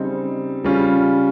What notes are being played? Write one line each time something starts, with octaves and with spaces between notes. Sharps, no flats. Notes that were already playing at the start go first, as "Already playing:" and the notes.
Already playing: C#3 G3 C4 D#4
C#3 G3 C#4 F4